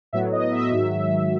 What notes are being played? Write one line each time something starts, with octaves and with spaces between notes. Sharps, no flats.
A2 F#3 B3 E5
D#5
E5
G#2 D#3 F#3